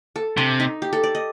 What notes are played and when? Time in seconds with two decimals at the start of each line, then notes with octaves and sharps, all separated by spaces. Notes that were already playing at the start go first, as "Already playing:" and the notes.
0.16 A4
0.37 C3 D4
0.60 D#4
0.82 G4
0.93 A4
1.04 D5
1.15 D#5